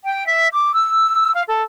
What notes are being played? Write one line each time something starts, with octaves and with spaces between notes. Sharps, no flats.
G5
E5
D6
E6
F5
A4